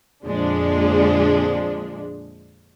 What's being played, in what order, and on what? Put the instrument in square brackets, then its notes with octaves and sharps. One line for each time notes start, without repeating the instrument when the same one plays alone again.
[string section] F2 A#2 D3 F3 G#3 D4